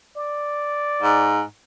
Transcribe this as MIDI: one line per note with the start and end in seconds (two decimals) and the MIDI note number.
0.17 1.36 74
1.02 1.41 44